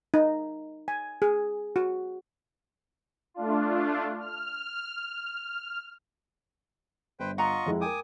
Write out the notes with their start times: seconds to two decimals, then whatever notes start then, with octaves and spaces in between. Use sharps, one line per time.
0.14 D#4
0.88 G#5
1.22 G#4
1.76 F#4
3.34 A3 D4 F4
4.19 F6
7.20 G1 B4 C5 G5
7.38 F4 D#5 F#5 A#5 C#6
7.66 F2 G#3 E4
7.81 A#4 G5 G#5 D6 D#6